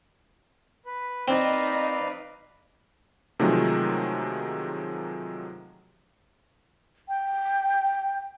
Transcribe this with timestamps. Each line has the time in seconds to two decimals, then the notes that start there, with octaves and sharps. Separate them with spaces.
0.86 B4
1.28 C4 D#4 B4 D5 D#5 F5
3.39 C3 D#3 F3 F#3 G#3 A3
7.09 G5